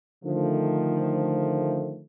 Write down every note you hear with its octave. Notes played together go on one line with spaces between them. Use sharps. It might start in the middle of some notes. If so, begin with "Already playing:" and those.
D3 D#3 F3 A3